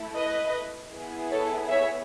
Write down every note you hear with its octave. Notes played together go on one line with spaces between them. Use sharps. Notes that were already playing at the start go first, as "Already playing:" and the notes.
Already playing: A3 E4
B4 D#5
B3 E4 G#4
A4 C#5
C#5 E5